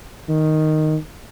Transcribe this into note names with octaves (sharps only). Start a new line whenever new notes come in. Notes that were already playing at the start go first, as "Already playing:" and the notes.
D#3